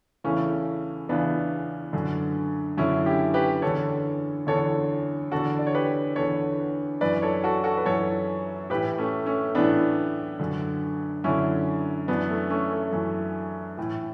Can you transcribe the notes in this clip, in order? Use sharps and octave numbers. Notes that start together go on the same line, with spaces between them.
E2 C#3 E3 A3 C#4
E2 C#3 E3 B3 D4
F#2 D3
F#2 D3 C#4 E4
E4 G4
G4 B4
E2 D3 A4 C#5
E2 D3 A4 C#5
E2 D3 F#4 A4
D5
C#5
G4 B4
E2 D3 A4 C#5
F#2 E3 B4 D5
A4 C#5
F#4 A4
F#4 A4
B4
F#2 E3 A4 C#5
A2 E3 G4 B4
A3 C#4
A3 C#4
A2 E3 B3 D4
F#2 D3
F#2 D3 C#4 E4
F#2 E3 B3 D4
A3
A3 C#4
A3
F#2 E3
A2 E3